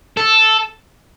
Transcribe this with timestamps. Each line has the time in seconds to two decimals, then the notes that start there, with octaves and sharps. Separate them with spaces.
0.17 A4